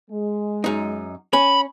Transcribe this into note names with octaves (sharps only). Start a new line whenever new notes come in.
G#3
F#2 D#4
C#4 B5